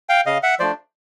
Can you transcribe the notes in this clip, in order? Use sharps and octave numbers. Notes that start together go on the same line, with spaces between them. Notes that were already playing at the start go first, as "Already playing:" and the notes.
F5 G5
C#3 D#5 F5
E5 F#5
F3 A3 D4 C5 D5